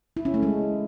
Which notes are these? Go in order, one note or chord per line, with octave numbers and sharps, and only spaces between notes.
E4
C#4
A3
G#3